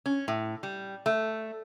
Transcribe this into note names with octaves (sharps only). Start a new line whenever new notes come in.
C#4
A2
G3
A3